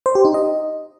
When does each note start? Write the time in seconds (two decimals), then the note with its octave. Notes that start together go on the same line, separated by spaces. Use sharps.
0.06 C5
0.15 G4
0.25 D#4
0.34 D#5